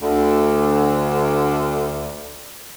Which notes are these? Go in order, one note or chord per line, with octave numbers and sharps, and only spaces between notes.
D2 D3